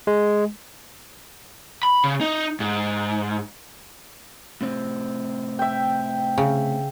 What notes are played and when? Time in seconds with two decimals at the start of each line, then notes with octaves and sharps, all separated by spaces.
0.07 G#3
1.83 B5
2.04 C#3
2.21 D#4
2.60 G#2
4.61 A2 C3 C4
5.59 E5 G5
6.38 C#3